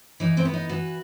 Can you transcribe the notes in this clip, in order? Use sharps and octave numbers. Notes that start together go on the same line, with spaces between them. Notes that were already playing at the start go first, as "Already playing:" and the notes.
E3 D#4
C4
B3
D#4
E3 F#4